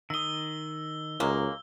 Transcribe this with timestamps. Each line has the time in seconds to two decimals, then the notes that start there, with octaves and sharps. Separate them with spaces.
0.10 D#3 D#6 E6 G7
1.20 C#2 F#3 G#3 A#3